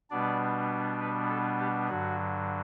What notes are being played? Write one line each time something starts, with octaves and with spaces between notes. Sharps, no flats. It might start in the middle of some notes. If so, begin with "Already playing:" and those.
B2 G3 B3 D4 D5
B4
A4
G4
G2 D3 F#3 F#4